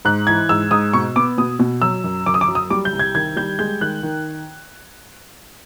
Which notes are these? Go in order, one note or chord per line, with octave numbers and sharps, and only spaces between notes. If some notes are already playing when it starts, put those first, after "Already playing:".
G#2 F#6
E3 G#6
G#2 E6
G#2 D#6
B2 C#6
B3 D6
B2 D#6
B2
F#3 E6
F#2
F#2 D6
D#6
D6
F#3
D#6
G3 D6
G6
C2
G#6
D#3 G#6
G3 G6
G#3 G6
D#3 F#6
D#3